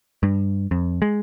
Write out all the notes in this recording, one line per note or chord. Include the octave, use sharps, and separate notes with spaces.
G2
F2
G#3